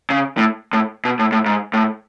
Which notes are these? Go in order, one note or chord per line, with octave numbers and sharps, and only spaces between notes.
C#3
A2
A2
B2
A2
A2
G#2
A2